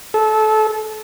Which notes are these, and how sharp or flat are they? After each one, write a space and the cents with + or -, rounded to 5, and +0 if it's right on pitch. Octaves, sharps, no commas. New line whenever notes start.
A4 -25